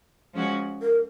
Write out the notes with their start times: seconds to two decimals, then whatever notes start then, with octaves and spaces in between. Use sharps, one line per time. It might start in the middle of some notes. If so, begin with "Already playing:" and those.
0.34 F3 G#3 C#4 F#4
0.82 A#4